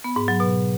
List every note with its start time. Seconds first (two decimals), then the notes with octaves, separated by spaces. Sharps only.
0.04 B3
0.16 G#2
0.28 F#3
0.40 B2